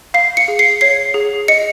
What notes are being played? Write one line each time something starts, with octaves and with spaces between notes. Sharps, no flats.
F5 C7
C#7
G#4
C7
C#5 C7
G#4
D#5 C#7